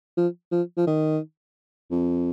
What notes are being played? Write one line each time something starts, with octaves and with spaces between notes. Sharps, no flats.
F3
F3
F3
D#3
F2